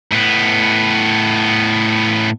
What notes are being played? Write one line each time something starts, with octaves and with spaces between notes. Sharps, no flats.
A2 B3